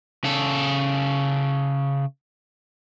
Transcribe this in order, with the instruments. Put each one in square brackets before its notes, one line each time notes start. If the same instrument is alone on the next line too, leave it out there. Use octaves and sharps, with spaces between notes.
[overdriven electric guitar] C#3 A4